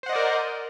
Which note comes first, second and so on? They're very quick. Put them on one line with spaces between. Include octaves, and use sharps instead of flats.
C5 F#5 D#5 D5 A#4